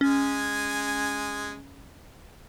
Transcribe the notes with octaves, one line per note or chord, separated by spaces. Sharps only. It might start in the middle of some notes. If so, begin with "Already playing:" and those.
G#3 C#4 G#5